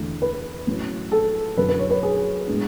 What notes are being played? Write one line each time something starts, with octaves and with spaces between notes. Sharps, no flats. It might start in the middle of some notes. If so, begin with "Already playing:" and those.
Already playing: E2 D3 A3
B4
A2 F#3 C#4
A4
F#2 D3 F#3 B4
B4
C#5
B4
G#4
A2 G#3 B3 D4